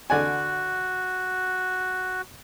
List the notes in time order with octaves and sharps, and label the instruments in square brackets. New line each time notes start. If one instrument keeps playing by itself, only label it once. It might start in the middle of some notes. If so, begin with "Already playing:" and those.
[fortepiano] D3 D5 G#5 [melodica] F#4